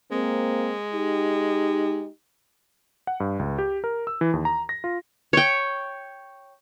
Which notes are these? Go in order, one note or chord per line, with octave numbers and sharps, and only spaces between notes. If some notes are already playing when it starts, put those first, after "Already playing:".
G#3 A#3 C4
D#4 G4
F#5
G2
C#2
G4
A#4
E6
E3
D#2
A#5
A#6
F4
C#5 G5